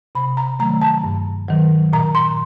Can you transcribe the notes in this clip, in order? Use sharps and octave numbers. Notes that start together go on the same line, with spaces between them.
C3 B5
A#5
D#3 F#3 A3 A#5
A5
G2
D#3 F#3
A#2 A#5
C6